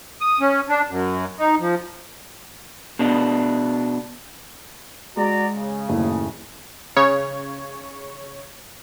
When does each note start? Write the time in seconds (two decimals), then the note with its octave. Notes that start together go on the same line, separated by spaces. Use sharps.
0.21 D#6
0.40 C#4
0.69 D4
0.89 F#2
1.39 D#4
1.59 F3
2.99 B2 D4 D#5
5.17 G#3 F#4 D5 A#5
5.55 C#3
5.89 F#1 D#2 A2
6.96 C#3 C#5